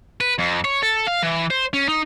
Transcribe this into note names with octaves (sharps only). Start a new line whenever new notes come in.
B4
F2
C#5
A4
F5
E3
C5
C#4
D#4